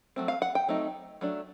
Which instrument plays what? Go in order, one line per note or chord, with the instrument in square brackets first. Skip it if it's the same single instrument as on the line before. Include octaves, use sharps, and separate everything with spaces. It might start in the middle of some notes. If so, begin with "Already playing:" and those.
[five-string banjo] F#3 A3 C4
F5
F#5
G5
F#3 A3 C4 D#4
F#3 A3 D4